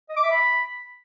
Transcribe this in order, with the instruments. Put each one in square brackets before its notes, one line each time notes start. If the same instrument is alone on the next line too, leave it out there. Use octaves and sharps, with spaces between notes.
[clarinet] D#5
D6
E5
B5